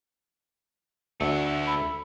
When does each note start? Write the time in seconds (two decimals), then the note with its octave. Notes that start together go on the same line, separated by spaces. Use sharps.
1.21 D2 A3 E5 F#5
1.67 B5